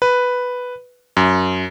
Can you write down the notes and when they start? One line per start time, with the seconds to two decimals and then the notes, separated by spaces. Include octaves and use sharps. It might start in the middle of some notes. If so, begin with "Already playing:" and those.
0.02 B4
1.17 F#2